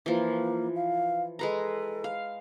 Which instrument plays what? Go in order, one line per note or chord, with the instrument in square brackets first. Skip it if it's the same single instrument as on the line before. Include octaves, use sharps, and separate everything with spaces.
[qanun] E3 F3 [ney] A#3
[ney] F5
[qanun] G#3 B4 A#5 [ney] A4
[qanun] F5